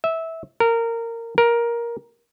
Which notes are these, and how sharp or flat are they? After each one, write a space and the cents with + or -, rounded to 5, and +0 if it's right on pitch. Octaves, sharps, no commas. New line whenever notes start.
E5 -15
A#4 -20
A#4 +10